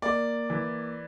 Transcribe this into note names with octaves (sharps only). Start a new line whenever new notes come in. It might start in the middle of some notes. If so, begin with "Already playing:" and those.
A#3 D5
E3